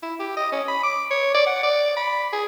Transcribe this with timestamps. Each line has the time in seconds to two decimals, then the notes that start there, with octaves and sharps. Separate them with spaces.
0.03 E4
0.19 G4
0.37 D#5
0.52 C#4
0.68 B5
0.84 D6
1.11 C#5
1.35 D5
1.47 F#5
1.63 D5
1.96 B5
2.33 G#4